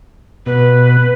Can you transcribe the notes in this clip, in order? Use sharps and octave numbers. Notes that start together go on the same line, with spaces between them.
B2 B4